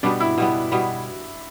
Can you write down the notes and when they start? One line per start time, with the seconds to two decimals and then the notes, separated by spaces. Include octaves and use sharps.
0.03 B2 G3 B3 D4
0.20 E4
0.38 B2 G3 B3
0.72 B2 G3 B3